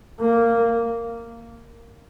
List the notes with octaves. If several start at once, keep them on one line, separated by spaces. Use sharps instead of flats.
A#3